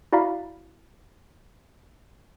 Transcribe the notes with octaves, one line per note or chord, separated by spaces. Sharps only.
E4 F#4 D5 F5 A#5 B5